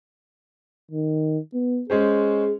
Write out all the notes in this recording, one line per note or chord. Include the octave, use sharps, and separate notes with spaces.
D#3
B3
G#3 C#4 G#4 C5